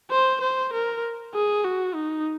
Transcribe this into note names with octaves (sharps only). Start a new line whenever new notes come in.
C5
C5
A#4
G#4
F#4
D#4